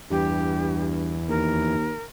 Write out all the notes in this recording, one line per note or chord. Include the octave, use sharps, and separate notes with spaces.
E2 G2 G4
D#2 A#4